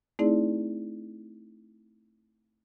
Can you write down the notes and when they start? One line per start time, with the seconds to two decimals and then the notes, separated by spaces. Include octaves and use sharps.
0.19 A3 C4 D#4 E4 G#4 D5